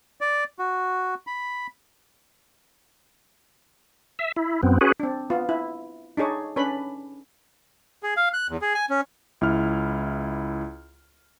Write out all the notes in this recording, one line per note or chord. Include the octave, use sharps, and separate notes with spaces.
D5
F#4
B5
E5
E4
F#2 B3 C4
C#4 F#4 G#4 B4
C4 D4
B3 F4
E4
D4 D#4 G#4 C#5
C#4 D4 B4 B5
G#4
F5
F#6
E2
G#4
G#5
C#4
C#2 E4 F6